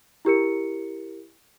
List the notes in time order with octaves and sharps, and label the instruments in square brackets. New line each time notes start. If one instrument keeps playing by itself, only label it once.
[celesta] E4 G4 A#4 C#7